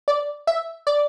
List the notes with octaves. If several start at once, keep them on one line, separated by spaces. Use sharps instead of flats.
D5
E5
D5